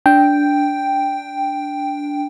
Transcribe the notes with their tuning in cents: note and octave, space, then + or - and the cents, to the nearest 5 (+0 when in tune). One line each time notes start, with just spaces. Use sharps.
D4 -10 G5 +0